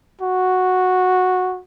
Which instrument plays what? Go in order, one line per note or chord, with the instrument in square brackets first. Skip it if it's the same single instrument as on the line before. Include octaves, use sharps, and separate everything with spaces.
[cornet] F#4